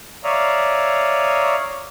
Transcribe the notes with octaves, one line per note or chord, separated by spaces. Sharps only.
C#5 D5 E5 F5 A#5 D#6